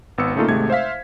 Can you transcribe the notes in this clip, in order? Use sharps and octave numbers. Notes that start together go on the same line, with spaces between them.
G#1 B3 E6 C#7
C#3 A3 A#3 D#4 F4 A4
G#1 C3 G#3 A3 G#6
C5 E5 F5 B6